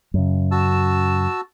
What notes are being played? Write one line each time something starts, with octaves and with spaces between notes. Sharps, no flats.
F#2 C#3
F#4 A5 E6